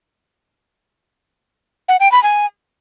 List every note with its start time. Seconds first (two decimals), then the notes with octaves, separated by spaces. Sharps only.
1.89 F#5
2.00 G5
2.12 B5
2.23 G#5